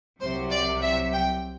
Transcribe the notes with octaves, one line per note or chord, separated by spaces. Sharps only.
C2 C3 F#3 C5
D5
E5
G5